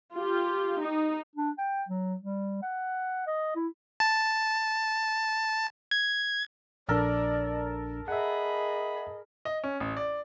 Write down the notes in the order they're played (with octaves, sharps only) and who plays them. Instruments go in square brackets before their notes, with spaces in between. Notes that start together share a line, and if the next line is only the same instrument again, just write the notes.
[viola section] F4 G4
D#4
[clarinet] D4
G5
F#3
G3
F#5
D#5
E4
[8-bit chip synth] A5
G#6
[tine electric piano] A#1 D4 [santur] A4 A#4 [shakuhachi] D5
[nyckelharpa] G#4 B5 [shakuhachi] D#5 [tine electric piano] E5 F#5
[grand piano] D#5
C#4
A1
D5